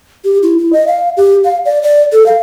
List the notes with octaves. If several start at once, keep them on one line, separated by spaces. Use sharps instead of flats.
G4
E4
E4
D#5
F5
G4
F5
D5
D5
A4
F5